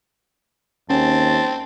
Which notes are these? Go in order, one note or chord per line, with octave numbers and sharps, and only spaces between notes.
D#2 C4 C#4 A5